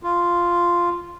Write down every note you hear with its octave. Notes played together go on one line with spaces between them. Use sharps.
F4